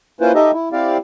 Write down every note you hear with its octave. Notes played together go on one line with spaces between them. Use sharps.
A#3 C#4 E4 F4 B4 C5
D#4 G4 A4 D#5 E5
E4
C4 E4 G4 D5 F5